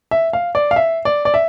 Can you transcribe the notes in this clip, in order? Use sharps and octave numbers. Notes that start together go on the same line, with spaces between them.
E5
F5
D5
F5
E5
D5
D5
E5